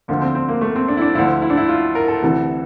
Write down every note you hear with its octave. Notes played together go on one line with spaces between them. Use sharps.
D2 D3 F3 A#3
C4
C4
A#3
A3
C4
D4
E4
D4
D2 D3 F3 E4
E4
D4
E4
F4
A#4
A4
D2 C3 E3